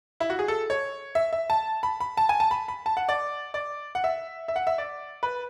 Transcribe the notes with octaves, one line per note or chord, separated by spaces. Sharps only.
E4
F#4
G#4
A4
C#5
E5
E5
A5
B5
B5
A5
G#5
A5
B5
B5
A5
F#5
D5
D5
F#5
E5
E5
F#5
E5
D5
B4